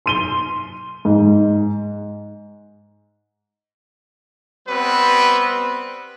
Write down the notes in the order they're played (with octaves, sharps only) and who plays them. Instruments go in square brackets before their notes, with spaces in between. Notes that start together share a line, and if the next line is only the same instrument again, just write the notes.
[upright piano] C6 D#7 G7
G#2
[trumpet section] G3 B3 C4 B4